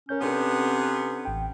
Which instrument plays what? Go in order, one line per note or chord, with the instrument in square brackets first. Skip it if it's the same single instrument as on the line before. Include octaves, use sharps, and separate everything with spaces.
[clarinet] C#4 [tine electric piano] A#4 C#5 G6
[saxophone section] C3 B3 [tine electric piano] C4 D4 A4
[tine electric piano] A1 G5